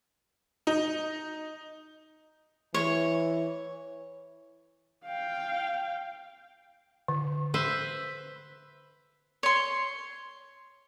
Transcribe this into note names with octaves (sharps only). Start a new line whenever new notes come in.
D#4
E3 C#5
F5 G5
D3
B4 C5 E5
C#5 C6